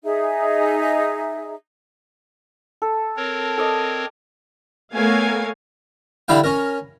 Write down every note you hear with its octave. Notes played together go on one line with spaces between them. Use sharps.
D#4 G#4 E5
A4
C4 A#4 C#5
A4 D5 D#5
A3 B3 A#4 C#5 F5 G#5
D3 G3 E4 F5 G5
C#4 A#4